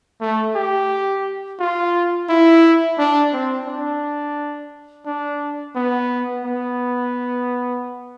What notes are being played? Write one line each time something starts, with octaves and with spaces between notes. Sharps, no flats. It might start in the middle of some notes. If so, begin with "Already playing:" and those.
A3
G4
F4
E4
D4
C4
D4
D4
B3
B3